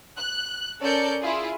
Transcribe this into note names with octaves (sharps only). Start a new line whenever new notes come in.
F#6
C#4 A4 A#4 D5 G6 C#7
E4 F4 G#4